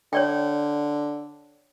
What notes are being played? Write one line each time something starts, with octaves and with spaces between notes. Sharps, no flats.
D3 C#5 D5 G5